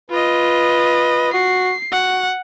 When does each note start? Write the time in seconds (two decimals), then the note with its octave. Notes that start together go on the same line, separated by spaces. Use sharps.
0.10 F4 B4 D#5
1.33 F#4 C7
1.92 F#4 F#5